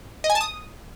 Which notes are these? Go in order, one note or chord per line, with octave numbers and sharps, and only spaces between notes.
D#5
G#5
A5
D#6